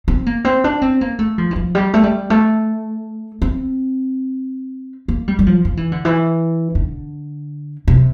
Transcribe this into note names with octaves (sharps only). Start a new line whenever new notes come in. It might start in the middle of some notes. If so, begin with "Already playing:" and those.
C4
A#3
C4
D4
C4
A#3
A3
F3
E3
F3
G3
A3
G3
A3
C4
A#3
G3
G3
F3
F3
E3
D3
E3
D3
C3